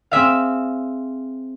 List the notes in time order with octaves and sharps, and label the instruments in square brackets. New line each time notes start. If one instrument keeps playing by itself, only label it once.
[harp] C4 G#4 E5 F5